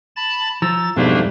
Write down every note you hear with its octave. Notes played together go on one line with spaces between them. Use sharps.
A5 B5 A6
F3 A#5 E6 A6
F2 G#2 B2 G3 A3 A#3 D4